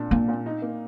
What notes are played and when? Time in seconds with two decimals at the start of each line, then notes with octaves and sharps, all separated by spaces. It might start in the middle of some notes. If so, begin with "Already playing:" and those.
Already playing: A#2 D4
0.11 A#2 A#3
0.28 A#2
0.46 D#4
0.62 A#3